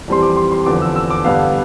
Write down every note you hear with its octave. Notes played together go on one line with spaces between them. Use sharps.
F2 E3 G3 C4 C6
D6
C6
C6
E2 D3 F3 D6
E6
E6
D6
G2 D3 G3 B3 F5